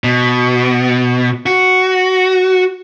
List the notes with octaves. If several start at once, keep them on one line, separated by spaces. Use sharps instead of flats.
B2
F#4